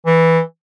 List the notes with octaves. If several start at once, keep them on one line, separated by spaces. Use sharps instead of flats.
E3